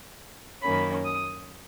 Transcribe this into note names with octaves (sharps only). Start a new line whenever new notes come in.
F#2 D#3 A#3 C#4 B5
D#6